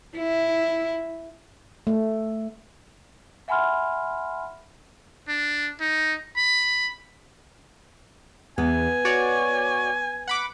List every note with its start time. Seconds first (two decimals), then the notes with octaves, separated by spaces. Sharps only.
0.17 E4
1.87 A3
3.48 E5 F#5 G#5 B5 C6 F6
5.28 D4
5.80 D#4
6.37 B5
8.58 E2 B3 G#5
9.05 F#4 C#5 D5
10.27 F#5 B5 D6